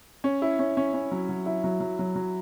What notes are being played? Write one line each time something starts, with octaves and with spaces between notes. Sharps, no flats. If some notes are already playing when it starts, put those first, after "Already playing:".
C#4
E4
C#4
C#4
C#4
F#3
F#3
E4
F#3
F#3
F#3
F#3